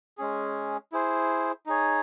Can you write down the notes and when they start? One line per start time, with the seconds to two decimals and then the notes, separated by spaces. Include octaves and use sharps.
0.18 G#3 C#4 G#4
0.92 E4 G#4 C5
1.66 D#4 G#4 C#5